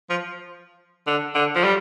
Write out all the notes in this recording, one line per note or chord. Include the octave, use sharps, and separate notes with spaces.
F3
D3
D3
F3
G3